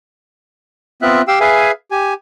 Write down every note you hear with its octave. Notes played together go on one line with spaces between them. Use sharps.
B3 C4 F4 E5 F#6
G4 F5 G5 E6
G#4 B4 E5 F5 G#5
G4 G#5